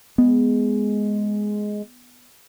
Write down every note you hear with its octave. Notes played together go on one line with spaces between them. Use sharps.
G#3 B3